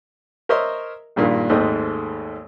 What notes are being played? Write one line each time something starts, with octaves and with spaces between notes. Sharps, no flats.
A#4 C5 C#5 D#5 E5 C6
A#1 G2 A#2 D#3 A#3
G#1 D#2 G#2 A3 C5 D#5